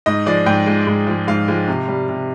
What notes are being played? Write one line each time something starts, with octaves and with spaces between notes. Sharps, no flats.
G#2 D#5
F3 G#3 D5
G#2 G5
F3 G#3
G#2
F3 G#3
G#2 F5
F3 G#3
C3
G3
C3